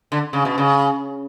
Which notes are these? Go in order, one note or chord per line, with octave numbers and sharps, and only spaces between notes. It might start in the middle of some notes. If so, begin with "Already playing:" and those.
D3
C#3
B2
C#3